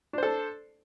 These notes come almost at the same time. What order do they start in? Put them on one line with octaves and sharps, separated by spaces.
D4 C5 A4